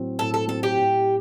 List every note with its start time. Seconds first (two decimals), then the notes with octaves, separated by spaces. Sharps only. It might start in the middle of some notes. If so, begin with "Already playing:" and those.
Already playing: A2 F#3 C4
0.19 A2 A4
0.34 A4
0.48 F#3 C4 A4
0.63 G4
0.78 A2